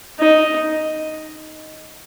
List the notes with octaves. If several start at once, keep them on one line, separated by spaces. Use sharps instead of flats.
D#4